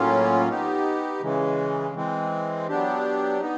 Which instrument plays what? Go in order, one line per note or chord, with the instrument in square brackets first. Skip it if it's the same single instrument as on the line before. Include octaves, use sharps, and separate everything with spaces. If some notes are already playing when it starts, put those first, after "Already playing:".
Already playing: [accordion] A2 F#3 A#3 C#4 F4
B3 D#4 G4
C#3 E3 G#3
E3 G#3 C4
F#3 B3 D4 G4
B3 D#4